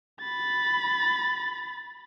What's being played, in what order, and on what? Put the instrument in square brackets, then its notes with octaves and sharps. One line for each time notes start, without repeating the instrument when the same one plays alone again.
[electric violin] B5 A6